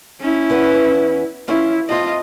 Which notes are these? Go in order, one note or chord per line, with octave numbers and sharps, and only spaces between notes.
C#4 E4
E2 B4 F#5
E3 C#4 E4 F4
A2 C4 F4 D#5